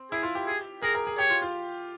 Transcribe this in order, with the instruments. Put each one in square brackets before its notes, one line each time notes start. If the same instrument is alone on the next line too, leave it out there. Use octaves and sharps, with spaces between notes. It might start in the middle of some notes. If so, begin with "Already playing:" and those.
Already playing: [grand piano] C4
[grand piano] E4 [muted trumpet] G#4
[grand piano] F4
G4
[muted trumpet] G#4
[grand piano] G#4 [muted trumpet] A#4
[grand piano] A#4
G#4
[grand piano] G4 [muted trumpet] C#5
[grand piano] F4
F4